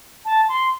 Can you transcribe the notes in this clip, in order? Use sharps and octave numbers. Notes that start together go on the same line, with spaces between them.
A5
C6